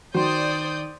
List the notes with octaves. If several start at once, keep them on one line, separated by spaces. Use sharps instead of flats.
D#3 F#4 C5 D5 C6 D#6 G6